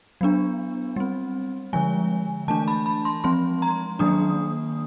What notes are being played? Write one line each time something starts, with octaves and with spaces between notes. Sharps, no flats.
F#3 B3 D4
G3 C4
D3 F3 G#3 G#5
E3 A3 D4 A5
B5
B5
C6
F3 G#3 C4 C6
A#5
D#3 F#3 A#3 D4 D#6